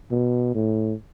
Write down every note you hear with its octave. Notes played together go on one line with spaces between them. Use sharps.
B2
A2